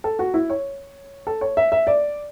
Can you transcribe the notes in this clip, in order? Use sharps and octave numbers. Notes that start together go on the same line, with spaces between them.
A4
F#4
E4
C#5
A4
C#5
E5
E5
D5